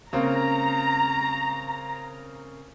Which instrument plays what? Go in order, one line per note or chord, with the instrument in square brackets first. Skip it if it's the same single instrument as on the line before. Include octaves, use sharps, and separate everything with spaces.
[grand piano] C#3 A#3 C4 [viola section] A#5